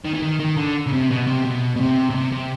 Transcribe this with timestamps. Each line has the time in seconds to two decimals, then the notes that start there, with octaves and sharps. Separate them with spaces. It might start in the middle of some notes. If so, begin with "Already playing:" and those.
0.05 D#3
0.14 E3
0.23 D#3
0.40 D#3
0.57 D3
0.87 C#3
0.93 C3
1.11 B2
1.27 C3
1.45 B2
1.76 B2
1.80 C3
2.10 B2
2.15 C3
2.32 C3